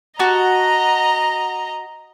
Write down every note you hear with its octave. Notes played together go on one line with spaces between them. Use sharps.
F#4 D#5 A5 A#5